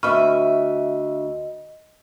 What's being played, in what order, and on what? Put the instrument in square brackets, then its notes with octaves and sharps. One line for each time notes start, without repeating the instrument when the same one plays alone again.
[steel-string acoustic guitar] D2 E5 [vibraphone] D#5 [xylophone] B5 C#6 F6